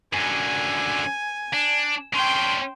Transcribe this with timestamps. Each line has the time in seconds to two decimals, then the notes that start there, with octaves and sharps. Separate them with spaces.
0.13 F#2 D3 G#5
1.54 D4
2.14 C#4 D4 G5 C6